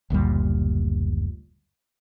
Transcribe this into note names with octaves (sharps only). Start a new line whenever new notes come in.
F#1 D2 A#2 G3